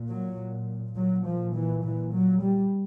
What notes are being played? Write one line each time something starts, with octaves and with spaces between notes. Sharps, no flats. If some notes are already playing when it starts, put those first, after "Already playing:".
Already playing: A#2
F#3
A#2 F#3
F3
E3
E3
F#3
G3